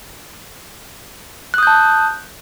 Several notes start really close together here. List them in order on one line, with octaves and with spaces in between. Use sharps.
F#6 D#6 G6 A5